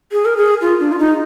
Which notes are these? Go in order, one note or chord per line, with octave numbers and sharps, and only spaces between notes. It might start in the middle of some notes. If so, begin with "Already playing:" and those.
G#4
A#4
G#4
F4
D4
F4
D#4